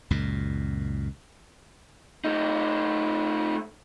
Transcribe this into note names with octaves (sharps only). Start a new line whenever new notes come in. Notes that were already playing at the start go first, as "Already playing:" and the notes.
C#2 F#2 A#2
A3 D#4